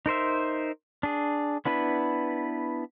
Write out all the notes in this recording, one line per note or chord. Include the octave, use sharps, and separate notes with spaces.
D#4 A#4 C5 E5
D4 G#4
B3 D4 E4 B4